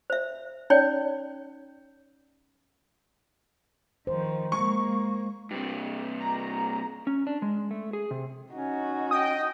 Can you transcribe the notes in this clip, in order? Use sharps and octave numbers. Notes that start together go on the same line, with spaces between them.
C5 E5
C#4 D#4 C#5 D5 G5
D#3 F3 C5
G#3 A#3 C#6
G2 C3
A#5
C#4
D4
G#3
A3
G#4
C3
C#4 D#4 F#4
D#5 G5 D#6